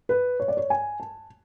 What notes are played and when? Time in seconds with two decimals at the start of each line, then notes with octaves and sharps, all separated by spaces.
0.09 B4
0.40 C#5
0.48 D5
0.57 C#5
0.70 G#5
1.00 A5